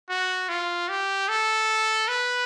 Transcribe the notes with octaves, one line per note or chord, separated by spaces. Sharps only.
F#4
F4
G4
A4
B4